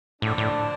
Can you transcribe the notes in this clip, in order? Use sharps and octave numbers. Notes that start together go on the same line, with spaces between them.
A2 D3 F3 D4
A2